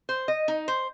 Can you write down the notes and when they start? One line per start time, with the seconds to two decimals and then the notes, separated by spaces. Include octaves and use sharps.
0.09 C5
0.28 D#5
0.48 D#4
0.68 C5